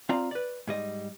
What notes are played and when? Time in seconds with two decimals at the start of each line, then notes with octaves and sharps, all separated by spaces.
0.09 C4 F4 D5 F5 A#5
0.31 B4 D5
0.68 G#2 G3 D#5